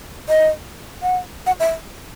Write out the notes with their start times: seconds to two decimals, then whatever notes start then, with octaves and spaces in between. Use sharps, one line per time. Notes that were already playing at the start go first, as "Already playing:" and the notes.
0.29 D#5
1.02 F#5
1.47 F#5
1.60 E5